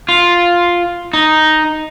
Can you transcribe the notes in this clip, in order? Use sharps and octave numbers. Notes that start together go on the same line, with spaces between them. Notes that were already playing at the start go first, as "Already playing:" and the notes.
F4
D#4